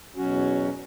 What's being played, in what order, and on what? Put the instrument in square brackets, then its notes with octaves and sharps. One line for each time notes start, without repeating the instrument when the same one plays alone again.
[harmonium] E2 B2 F#3 C#4 F#4